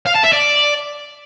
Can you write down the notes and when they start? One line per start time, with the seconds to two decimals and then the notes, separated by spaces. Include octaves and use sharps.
0.06 F5
0.14 A5
0.23 E5
0.32 D5